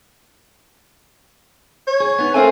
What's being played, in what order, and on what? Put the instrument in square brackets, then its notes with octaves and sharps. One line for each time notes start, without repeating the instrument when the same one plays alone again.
[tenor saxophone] C#5
[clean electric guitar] G#4
B3 D#4
[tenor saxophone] A3 [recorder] C4 [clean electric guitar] A#4 F5 G#5